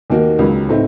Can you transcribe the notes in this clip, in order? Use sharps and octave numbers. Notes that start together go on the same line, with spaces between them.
D#2 D#3 A#3 D#4 F#4
C#2 C#3 F#3
A2 A3 C4 D#4